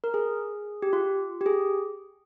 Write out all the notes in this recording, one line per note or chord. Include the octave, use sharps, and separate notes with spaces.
A#4
G#4
G4
F4
G4
G#4